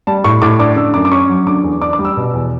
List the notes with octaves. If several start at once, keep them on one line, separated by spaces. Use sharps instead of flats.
G3 A5
A2 C#6
A2 D6
D4 D6
D3 E6
F#2 D6
D6
C#4 C#6
F#3
D3 D6
E2
D4 D6
D6
G3
E6
B2
E2